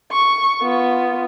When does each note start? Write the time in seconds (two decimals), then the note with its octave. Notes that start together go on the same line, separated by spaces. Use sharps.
0.12 C#6
0.63 B3 F4